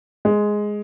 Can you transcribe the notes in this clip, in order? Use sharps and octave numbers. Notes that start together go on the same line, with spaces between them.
G#3